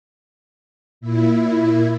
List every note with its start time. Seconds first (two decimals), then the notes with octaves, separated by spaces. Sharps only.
1.01 A#2 E4